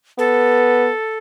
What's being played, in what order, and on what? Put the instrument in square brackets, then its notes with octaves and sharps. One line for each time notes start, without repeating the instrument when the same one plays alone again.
[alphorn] B3 [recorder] A4